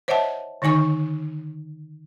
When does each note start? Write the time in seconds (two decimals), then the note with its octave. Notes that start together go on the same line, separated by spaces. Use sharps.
0.08 C5 C#5 D#5 E5 F#5 A5
0.62 D3 D#3 D#4 G#5 C#6